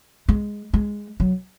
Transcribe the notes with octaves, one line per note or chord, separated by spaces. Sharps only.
G#3
G#3
F#3